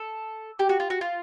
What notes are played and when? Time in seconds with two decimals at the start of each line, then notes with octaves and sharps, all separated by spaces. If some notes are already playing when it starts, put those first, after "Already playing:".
Already playing: A4
0.59 G4
0.69 F#4
0.80 F4
0.90 F#4
1.01 F4